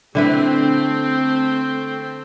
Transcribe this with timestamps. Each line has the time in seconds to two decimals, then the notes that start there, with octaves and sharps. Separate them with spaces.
0.15 D3 A3 C4 E4 B4